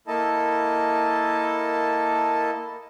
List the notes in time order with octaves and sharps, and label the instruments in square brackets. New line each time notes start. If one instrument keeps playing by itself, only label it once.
[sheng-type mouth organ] A#3 E4 A4 D#5 A5